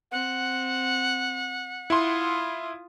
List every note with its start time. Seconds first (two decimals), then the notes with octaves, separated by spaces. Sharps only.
0.11 C4 F#5
1.90 E4 F4 C6 D#6